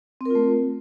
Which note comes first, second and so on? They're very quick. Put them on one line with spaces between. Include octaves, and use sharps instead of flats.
C4 A#4 F4 A3